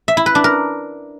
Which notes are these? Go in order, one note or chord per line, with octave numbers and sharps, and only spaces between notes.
E5
E4
B4
D4
A#4